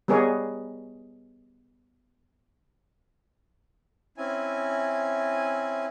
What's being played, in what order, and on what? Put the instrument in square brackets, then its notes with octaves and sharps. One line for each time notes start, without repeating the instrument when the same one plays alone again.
[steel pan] G3 B3 G#4 A#4 C#5 D#5
[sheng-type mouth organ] C4 C#4 E4 G#5